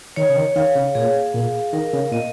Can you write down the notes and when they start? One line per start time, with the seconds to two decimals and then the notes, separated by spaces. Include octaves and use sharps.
0.16 D#3 C#5
0.29 C#3
0.36 D#3
0.56 D#3 F5
0.75 C#3
0.95 A#2 G#4
1.34 A#2 F5
1.73 D#3 A#4
1.93 C#3
2.12 A#2 D#5